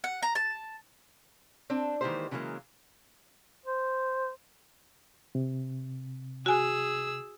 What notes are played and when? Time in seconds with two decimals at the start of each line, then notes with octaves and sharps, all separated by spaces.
0.04 F#5
0.22 A#5
0.35 A5
1.70 C4 D4
2.01 D#3 E3 G#3 A#3 G4 C5
2.31 C#3 E3 F#3 G#3 A#3
3.66 C5
5.35 C3
6.46 F#4 G#4 G#5 E6